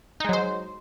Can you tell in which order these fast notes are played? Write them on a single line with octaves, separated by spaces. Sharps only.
D#4 G#3 F#3 C5